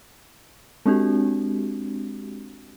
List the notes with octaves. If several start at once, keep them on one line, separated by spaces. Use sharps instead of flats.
G#3 C4 D4 F#4 G4